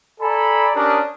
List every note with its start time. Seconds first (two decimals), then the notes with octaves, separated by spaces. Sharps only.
0.21 A4 D5 G#5 A#5 B5
0.75 C#4 D4 G4 A#4 D#6